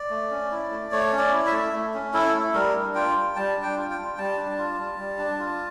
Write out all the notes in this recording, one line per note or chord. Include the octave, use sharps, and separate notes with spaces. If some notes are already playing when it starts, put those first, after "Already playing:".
Already playing: D5
A3
C#4
E4
A3
A3 C#5
C#4
D5
E4
E5
A3
A3
C#4
E4 A4
A3
G3 A#4
D4
F4 G5
G3
G3 A5
D4
G5
F4
G5
G3
G3 A5
D4
F4
G3
G3
D4
F4